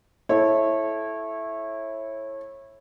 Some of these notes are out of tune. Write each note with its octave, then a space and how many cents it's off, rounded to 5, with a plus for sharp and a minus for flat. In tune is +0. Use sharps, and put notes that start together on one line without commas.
E4 +0 A4 -15 C#5 -25